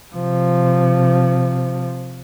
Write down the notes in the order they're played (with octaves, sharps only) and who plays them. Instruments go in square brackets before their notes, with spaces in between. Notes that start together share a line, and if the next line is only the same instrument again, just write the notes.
[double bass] C3 F3